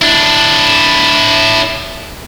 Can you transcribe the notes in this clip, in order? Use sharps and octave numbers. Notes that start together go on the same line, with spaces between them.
D4 E4